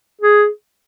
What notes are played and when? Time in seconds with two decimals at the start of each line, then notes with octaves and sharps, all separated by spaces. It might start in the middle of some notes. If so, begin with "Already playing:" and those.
0.21 G#4